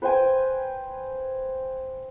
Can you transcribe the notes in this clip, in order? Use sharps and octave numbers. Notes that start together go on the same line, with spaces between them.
B4 C5 G5 G#5